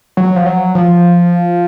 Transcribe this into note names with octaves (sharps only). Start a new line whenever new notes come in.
F#3
F3
F#3
F3